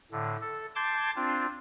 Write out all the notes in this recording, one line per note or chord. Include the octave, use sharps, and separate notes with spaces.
A2 D3
A4
A5 C6 D6 G6 G#6
C4 D4 F4